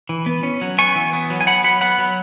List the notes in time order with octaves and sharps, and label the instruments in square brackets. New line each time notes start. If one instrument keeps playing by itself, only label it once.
[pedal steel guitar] E3
B3
C#4
F#3
B3 G#5 C#6
E3
B3
F#3
G#5
B3 F#5 B5
F#3 F#5 B5
B3 F#5 B5
F#3